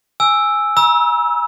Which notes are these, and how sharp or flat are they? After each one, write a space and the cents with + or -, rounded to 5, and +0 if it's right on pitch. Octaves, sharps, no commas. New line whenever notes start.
G#5 +0 E6 +0
A#5 +45 E6 -25